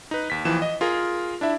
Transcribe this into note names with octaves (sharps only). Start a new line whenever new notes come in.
D#4 B4
D#2 B6
D#2 E3 F3 E7
D#5
F4 G#4 A#4
D4 E4 E5